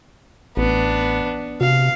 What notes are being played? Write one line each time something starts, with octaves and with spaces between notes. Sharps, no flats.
A1 B3 D4
C3 F#4 F5